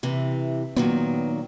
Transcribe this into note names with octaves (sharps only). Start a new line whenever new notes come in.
C3 E3
A#2 D#3 F#3 B3